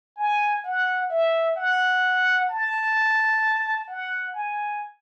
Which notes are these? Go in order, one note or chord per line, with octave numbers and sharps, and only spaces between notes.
G#5
F#5
E5
F#5
A5
F#5
G#5